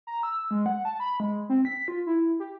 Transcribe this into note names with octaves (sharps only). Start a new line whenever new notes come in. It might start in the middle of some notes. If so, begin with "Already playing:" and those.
A#5
E6
G#3
F#5
A5
B5
G#3
C4
B6
F4
E4
G4